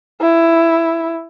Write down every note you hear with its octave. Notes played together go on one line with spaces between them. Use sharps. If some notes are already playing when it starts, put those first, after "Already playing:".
E4